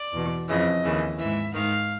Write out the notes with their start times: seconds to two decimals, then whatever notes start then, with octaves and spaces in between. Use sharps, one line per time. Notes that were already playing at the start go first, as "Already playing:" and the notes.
Already playing: D5
0.13 E2 B2
0.48 F2 C#3 E3 D#5
0.84 D#2 C#3 E3
1.19 G#2 E3 E5
1.54 G#2 D#3 F5